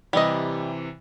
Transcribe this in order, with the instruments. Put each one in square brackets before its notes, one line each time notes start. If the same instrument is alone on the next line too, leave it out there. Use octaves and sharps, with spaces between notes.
[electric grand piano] C3 E3 [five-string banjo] G3 D#5